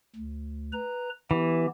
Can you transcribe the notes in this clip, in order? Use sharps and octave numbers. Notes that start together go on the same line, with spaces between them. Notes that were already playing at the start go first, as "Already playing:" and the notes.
D2
B4 A#5
E3 B3 G4